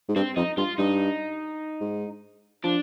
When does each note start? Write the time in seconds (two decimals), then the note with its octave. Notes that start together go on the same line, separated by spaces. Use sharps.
0.09 G#2
0.16 G2 C4
0.36 F2 D#4
0.57 G2 F4
0.78 G2 D#4
1.81 G#2
2.64 F3 D4